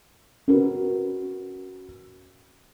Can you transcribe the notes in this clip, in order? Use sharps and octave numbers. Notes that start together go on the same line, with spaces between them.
C#4 F#4 A#4 B4